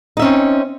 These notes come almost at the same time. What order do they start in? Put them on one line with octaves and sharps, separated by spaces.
D#4 E5 C#4 C4